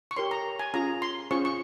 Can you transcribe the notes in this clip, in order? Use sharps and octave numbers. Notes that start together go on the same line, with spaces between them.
C#6
G4 A#4 C#5 C6
A#5
G#5
C#4 F4 G#4 A#5
C6
C#4 F4 G#4 C5 C#6
C#6